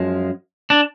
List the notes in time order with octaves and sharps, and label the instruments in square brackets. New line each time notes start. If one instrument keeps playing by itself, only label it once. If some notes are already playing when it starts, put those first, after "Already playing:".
Already playing: [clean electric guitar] F#2 F3 G#3
D4